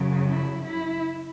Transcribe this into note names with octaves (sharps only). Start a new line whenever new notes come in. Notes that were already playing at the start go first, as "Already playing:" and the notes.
Already playing: F#2 C#3 F#3
E4
E4